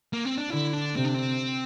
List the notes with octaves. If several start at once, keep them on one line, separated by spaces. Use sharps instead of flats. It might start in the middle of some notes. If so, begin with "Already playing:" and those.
A#3
C4
D4
D3 E4
D4
C3 C4
D4
C4